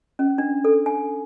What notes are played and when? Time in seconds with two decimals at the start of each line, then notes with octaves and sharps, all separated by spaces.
0.19 C#4
0.38 D4
0.64 A4
0.86 G#5